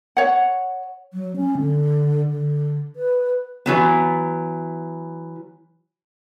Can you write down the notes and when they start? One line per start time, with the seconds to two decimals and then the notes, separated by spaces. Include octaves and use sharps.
0.17 C#5 F#5
1.13 F#3
1.36 C#4
1.58 D3
2.27 D3
2.96 B4
3.66 E3 F#3 B3